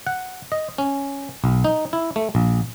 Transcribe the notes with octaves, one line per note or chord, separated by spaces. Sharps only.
F#5
D#5
C#4
B1
D#4
E4
A3
A#1